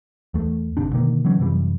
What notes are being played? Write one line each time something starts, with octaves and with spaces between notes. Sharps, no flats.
E2 A3
G1 C3 D4
B2 D3 D#3 A#3
C#3 E3 F#3 C#4
F#2 C3 E3 G3